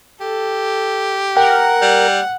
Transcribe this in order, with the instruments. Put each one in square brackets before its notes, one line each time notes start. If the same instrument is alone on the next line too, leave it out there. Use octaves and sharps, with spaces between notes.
[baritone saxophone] G4 [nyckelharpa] A4
[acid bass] A#4 [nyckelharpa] F#5 [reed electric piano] G5
[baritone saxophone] G3